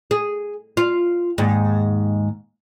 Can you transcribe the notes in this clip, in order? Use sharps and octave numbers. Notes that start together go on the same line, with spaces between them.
G#4
F4
D#2 G#2